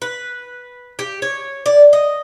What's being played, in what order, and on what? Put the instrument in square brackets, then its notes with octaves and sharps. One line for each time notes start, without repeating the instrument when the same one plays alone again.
[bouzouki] B4
G4
C#5
D5
D#5